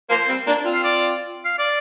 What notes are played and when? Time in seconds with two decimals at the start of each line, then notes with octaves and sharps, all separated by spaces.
0.10 F3 A#3 C5
0.29 G3 C4
0.47 A#3 D4
0.65 C4 F4
0.74 F5
0.84 D5
1.45 F5
1.59 D5